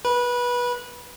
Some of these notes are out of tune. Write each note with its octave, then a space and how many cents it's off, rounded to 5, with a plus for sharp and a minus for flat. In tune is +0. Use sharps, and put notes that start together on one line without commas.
B4 -20